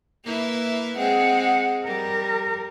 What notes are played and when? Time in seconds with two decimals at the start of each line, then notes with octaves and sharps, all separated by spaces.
0.25 A#3 E4 B4
0.97 G#3 C4 G#4 F#5
1.86 G3 A#4